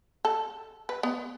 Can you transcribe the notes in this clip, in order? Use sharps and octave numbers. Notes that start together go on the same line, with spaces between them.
A4
B4
B3